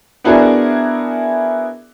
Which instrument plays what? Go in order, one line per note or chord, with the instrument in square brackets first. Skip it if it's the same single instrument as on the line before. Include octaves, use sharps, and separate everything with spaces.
[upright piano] B3 D4 E4 F#4 G#4 A#4